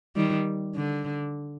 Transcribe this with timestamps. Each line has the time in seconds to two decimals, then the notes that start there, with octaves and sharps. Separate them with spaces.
0.16 D#3 G3
0.75 D3